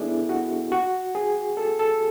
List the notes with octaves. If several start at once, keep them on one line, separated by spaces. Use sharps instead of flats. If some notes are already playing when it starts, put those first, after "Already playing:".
Already playing: B3 D4 E4 G#4 A4
F#4
F#4
G#4
A4
A4